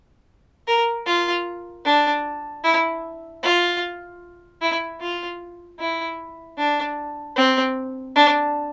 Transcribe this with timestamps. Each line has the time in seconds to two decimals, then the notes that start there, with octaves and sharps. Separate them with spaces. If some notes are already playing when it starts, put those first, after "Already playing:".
0.68 A#4
1.07 F4
1.85 D4
2.64 E4
3.43 F4
4.62 E4
5.01 F4
5.80 E4
6.58 D4
7.36 C4
8.16 D4